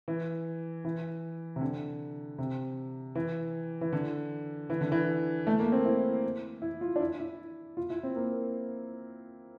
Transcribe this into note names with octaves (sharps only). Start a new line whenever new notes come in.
E3
E3
C3
D3
C3
E3
E3
D3
E3
D3
E3
A3
A#3
C4
E4
E4
F4
D4
E4
E4
F4
E4
C4
A#3